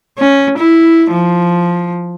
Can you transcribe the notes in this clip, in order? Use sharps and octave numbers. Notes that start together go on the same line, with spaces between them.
C#4
E4
F3